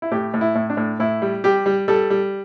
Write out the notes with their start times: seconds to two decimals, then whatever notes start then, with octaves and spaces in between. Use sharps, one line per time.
0.02 E4
0.12 A2 G4
0.34 A2
0.41 E4
0.55 A2
0.70 D4
0.77 A2
1.00 A2 E4
1.22 G3
1.44 G3 G4
1.66 G3
1.88 G3 A4
2.10 G3